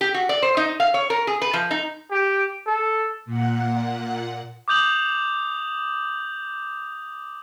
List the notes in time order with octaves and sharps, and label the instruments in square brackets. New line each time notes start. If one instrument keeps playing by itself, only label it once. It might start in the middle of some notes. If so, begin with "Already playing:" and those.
[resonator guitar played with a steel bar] G4
F#4
D5
C5
D#4
F5
C#5
A#4
G#4
B4
F3
D#4
[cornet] G4
A4
[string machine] A#2 F#5
[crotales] D6 D#6 G6 F7 F#7